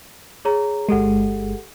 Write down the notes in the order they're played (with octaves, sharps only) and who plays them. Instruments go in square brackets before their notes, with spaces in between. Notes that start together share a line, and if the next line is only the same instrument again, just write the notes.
[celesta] G#4 C#5 A#5
[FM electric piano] G1 G#3 [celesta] G4 A4 F#5